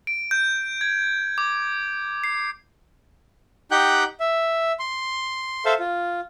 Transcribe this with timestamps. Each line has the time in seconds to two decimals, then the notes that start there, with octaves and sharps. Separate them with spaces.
0.07 D7
0.31 G6
0.81 G#6
1.38 D6
2.24 C7
3.71 D#4 G4 F#5 G5 F#6 G6
4.20 E5
4.79 C6
5.65 A4 C5 E5 F5
5.79 F4